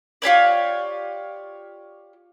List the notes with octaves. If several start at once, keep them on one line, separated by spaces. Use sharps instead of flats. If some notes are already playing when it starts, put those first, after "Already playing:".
F4 G4 C#5 D5